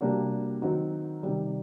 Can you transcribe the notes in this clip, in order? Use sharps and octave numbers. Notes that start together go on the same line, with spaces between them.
C3 G3 A#3 D4 F#4
D#3 F#3 C4 D#4 F#4
C3 D#3 G3